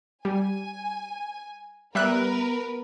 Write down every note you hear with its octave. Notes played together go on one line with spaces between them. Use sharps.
G3 G#5
G3 B3 A#4 B4 E5 F#6